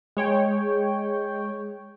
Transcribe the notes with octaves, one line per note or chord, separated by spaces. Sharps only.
G#3 C#5 G5